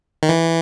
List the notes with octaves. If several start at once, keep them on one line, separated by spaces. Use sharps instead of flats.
D#3
E3